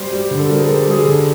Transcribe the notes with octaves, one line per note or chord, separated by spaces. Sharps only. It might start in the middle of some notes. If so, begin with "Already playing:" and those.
Already playing: G3 C5
G3
D3
A4
G3 A#4
G#4
A4
G3
A4
G3 G#4
D3 A4